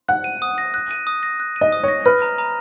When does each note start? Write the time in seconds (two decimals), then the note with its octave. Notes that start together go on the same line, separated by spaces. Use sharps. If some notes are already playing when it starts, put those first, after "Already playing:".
0.08 F#5 F#6
0.24 D#7
0.42 D#6
0.58 A#6
0.74 F#6
0.91 D#7
1.07 D#6
1.23 A#6
1.40 F#6
1.56 D#7
1.61 D#5
1.72 D#6
1.83 C#5
1.88 A#6
2.06 B4 F6
2.22 A#5
2.38 A#5